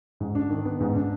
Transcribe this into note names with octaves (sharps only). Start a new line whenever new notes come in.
G#2
D4
D#3
B3
G#2
D4